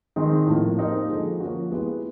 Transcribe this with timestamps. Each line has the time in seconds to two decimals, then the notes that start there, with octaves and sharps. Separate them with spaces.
0.16 D#3 G#3 C4 D#4
0.47 A2 F3 A#3
0.78 A#3 D#4 G4 C5
1.09 D3 F3 G#3
1.40 F3 A#3 C#4 F#4
1.72 G#3 B3 E4 G4 B4